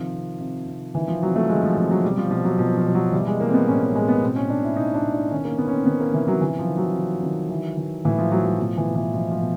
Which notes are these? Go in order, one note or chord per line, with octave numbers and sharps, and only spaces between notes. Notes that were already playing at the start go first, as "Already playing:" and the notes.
Already playing: C3 D#3 F3
C3
C3
C3
D#3 E3
F3
C3 F#3
A3
D#3 G#3
F3
C3 F3
F#3
B2 G3
F3
B2 F3
F#3
B2 F3
F3
B2
F#3
E3 G3
G#3
E3 A#3
C4
B3
A2 C#4
C#4
A2 G#3
B3
B2 C4
C#4
B2 D4
E4
B2 D#4
D4
B2
D4
D#3 C#4
A#3
D#3 B3
C#4
C4
D#3 B3
A#3
C3 E3
F#3
C3 E3
F3
D#3
F#3
D#3
D#3
E3
E3
A2 E3
F3
A2 F#3
F#3
B2 F3
E3
B2
E3
B2 F3
F3
B2